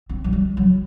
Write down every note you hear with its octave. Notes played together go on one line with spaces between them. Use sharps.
C4
F#3
G3
F#3